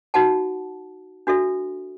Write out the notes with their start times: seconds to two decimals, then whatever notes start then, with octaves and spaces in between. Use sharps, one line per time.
0.14 D#4 F#4 F#5 A5
1.27 D4 F#4 A4 E5